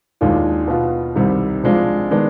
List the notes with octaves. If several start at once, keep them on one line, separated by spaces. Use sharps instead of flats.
D#2 D#3 G#3 D4 F4
B2 B3 F4
C2 C3 D#3 G3
C3 F3 G#3 D4 F4
D#3 G#3 B3 D4